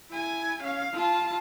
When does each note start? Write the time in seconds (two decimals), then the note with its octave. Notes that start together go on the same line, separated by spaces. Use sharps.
0.10 E4 G#5
0.63 C#4 F5
0.93 F4 A5